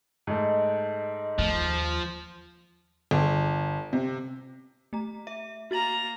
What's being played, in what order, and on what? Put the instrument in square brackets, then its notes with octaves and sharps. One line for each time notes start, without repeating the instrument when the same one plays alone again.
[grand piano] G#2 A3 [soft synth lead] D#5
[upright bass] D#2 [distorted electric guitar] F3
[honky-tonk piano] G1
C3
[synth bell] A3 A#5
E5
[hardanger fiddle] A#3 A#5 [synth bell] F#4 A6 F#7